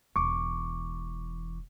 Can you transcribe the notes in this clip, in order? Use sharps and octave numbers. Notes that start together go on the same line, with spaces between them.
E1 E3 C#6 D6